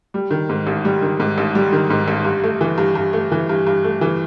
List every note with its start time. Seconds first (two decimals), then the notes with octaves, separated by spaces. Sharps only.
0.14 G3
0.31 D#3
0.49 G#2
0.67 A1
0.85 G3
1.02 D#3
1.20 G#2
1.38 A1
1.55 G3
1.73 D#3
1.90 G#2
2.08 A1
2.25 G2
2.44 A3
2.61 E3
2.78 G2
2.95 G2
3.13 A3
3.32 E3
3.49 G2
3.67 G2
3.84 A3
4.01 E3